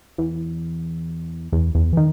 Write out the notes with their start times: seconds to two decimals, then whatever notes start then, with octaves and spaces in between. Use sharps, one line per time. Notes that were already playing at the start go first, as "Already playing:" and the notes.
0.18 E2
1.52 E2
1.75 E2
1.93 E3
1.97 D#3